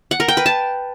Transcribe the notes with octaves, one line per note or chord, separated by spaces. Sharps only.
F#5
A#4
G5
B4
A5